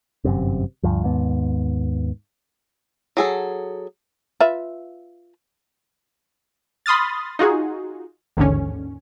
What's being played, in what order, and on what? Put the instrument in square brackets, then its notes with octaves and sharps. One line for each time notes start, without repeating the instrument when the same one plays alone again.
[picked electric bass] G1 F#2 C3
D2 G2 F3
D#2 G#2 B3
[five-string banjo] F#3 G#4 A4
[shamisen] F4 B4 E5
[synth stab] B5 C6 D#6 F6 A6
D#4 F4 F#4 G#4
A1 D#2 G#2 D3 C#4